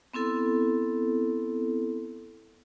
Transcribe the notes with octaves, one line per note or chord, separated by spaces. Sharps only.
B3 C4 E4 A4